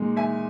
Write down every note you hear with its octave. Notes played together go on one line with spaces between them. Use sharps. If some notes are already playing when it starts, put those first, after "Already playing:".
Already playing: A#2 G#3 D#4
E5 G#5